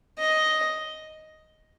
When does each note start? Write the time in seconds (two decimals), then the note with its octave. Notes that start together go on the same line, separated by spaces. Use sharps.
0.19 D#5